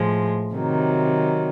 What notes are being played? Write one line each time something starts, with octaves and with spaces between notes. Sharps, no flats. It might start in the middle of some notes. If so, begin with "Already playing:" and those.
Already playing: A2 F3 G#3
C3 D#3 F#3